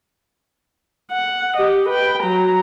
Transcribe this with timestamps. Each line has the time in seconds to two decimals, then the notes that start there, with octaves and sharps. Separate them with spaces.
1.11 F#5
1.57 G4 D#5
1.89 B4 G5
2.23 F#3 A#5